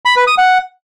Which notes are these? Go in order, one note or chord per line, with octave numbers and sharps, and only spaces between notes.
B5
B4
D#6
F#5